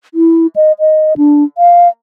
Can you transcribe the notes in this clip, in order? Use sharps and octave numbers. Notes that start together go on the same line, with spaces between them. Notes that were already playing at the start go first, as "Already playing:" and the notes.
E4
D#5
D#5
D4
F5